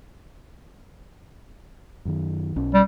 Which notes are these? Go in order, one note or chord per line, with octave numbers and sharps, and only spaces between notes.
F#2 D#3
B1 C#4
G3